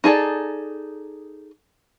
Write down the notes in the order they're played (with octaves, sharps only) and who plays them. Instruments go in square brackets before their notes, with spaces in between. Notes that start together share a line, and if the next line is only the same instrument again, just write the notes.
[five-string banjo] D#4 G#4 A4 D5